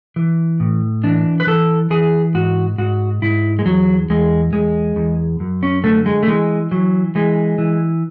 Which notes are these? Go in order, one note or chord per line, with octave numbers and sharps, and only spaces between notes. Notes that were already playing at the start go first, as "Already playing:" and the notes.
E3
A2
E3 D4
B4
E3 A4
E3 G#4
G#2 F#4
G#2 F#4
G#2 E4
G#3
E2 F#3
E2 G#3
E2 G#3
E2
F#2
C#4
D3 A3
G#3
A3
E3 G#3
E3 F#3
E3 G#3
E3